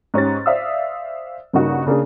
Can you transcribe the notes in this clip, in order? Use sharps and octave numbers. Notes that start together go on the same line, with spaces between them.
G#2 C#4 G4 A6
C5 D5 E5 F5 D#6 E6
G2 C#3 A#3 D#4 F#4
C#3 A#3 D4 G#4